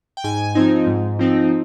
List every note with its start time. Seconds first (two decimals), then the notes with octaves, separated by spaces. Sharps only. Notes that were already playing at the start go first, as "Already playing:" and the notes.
0.17 G5
0.24 G#2 G#5
0.55 F3 C4 D#4
0.87 G#2
1.19 F3 C4 D#4